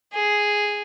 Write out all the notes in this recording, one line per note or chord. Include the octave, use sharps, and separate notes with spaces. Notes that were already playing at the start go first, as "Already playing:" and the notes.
G#4